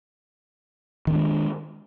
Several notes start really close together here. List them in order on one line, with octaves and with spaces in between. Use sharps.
D#3 C4 D4 G#3